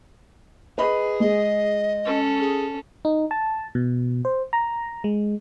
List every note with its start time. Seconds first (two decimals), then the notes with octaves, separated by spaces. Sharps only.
0.78 G#4 B4 D#5 B5
1.20 G#3 D#5
2.05 C#4 A4
2.40 G#4
3.05 D#4
3.31 A5
3.75 B2
4.25 C5
4.53 A#5
5.04 G#3